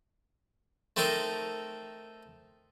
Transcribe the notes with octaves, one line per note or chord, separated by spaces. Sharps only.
A3 C4 D#4 A4 A#4